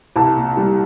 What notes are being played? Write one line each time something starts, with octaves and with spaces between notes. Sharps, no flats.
C2 A5
A#2
G3